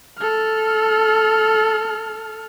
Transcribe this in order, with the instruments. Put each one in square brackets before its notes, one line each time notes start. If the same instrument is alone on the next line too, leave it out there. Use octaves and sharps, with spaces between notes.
[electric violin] A4 F6